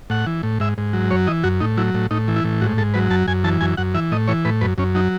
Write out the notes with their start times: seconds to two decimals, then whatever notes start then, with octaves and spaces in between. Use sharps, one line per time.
0.10 A2 F#5
0.27 E3
0.43 A2
0.60 G#2 E5
0.78 G#2
0.93 F#3
1.11 F#2 C#5
1.27 E3 D#5
1.43 F#2 F#4
1.60 A2 D#4
1.77 F#3 E4
1.94 A2
2.11 A2 D#4
2.28 E3
2.36 E4
2.44 A2
2.61 G#2 F#4
2.77 G#2 A4
2.94 F#3 B4
3.11 F#2 A5
3.28 F#2 G#5
3.44 E3 A5
3.61 F#2 G#5
3.77 F#2 F#5
3.94 E3 E5
4.11 A2 D#5
4.28 E3 C#5
4.45 A2 B4
4.61 F#2 B4
4.78 F#2 C#4
4.95 F#3 D#4